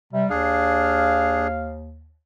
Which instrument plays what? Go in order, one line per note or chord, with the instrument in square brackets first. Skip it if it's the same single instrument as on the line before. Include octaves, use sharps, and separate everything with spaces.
[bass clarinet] C3 [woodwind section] G3
[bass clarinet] D#2 [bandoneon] D4 G#4 [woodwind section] F5